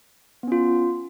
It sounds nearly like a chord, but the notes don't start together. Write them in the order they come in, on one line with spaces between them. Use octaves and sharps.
B3 C#4 F4